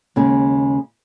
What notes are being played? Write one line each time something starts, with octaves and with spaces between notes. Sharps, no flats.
D#2 C#3 G#3